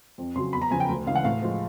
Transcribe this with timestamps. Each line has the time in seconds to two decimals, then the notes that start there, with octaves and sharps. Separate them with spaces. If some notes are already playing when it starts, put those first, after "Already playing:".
0.18 F2
0.35 C#3 F#3 C6
0.53 E2 B5
0.62 A#5
0.71 C#3 F3 G#5
0.80 G5
0.89 D2
1.07 C#3 E3 G#3 F5
1.15 F#5
1.24 A2 F5
1.42 F3 G#3